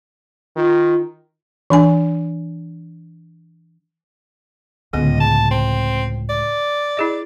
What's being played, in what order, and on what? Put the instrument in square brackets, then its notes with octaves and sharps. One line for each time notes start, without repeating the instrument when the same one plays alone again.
[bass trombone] D#3 [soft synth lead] F4
[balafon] E3 D4 G#5
[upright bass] C#2 A2 [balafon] D3 B3 [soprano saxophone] D#5
[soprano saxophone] A5
C4
D5
[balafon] E4 G#4 D#5